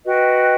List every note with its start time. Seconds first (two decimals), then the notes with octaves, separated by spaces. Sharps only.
0.04 F#4 B4 D#5 G5